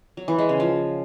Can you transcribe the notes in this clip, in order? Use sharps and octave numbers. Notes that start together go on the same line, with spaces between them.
F#3
E3
G#3
C#3
F3